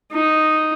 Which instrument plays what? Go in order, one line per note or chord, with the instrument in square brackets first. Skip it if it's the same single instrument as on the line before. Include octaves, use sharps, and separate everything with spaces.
[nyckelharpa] D#4